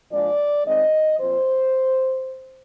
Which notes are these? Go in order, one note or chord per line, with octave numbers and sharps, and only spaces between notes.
A#2 F3 G#3 D4 D5
D#3 G#3 C4 D#4 D#5
A#2 F3 C4 C5